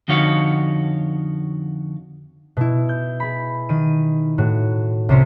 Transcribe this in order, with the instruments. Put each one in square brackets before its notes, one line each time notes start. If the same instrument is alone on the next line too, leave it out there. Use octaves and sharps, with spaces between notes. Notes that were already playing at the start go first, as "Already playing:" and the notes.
[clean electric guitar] F2 D3 D#4 F#4 C#5 F5
[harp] B2 E4
G6
G#4 B5
D#3 D#7
A2 F#4
C2 C3 C#4 C5 C#5